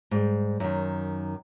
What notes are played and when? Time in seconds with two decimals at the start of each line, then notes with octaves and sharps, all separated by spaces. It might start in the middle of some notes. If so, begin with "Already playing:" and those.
0.11 G#2 G3
0.60 F#2 D#3